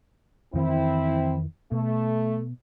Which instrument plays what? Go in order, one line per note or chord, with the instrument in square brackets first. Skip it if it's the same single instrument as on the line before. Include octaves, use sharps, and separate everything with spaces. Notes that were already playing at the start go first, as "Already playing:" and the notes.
[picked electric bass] F2 D#3 E3 [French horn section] C4 E4
[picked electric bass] B2 [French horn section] A3